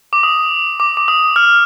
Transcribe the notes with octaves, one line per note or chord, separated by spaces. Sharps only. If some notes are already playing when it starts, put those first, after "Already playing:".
D6
D#6
D6
D6
D#6
F6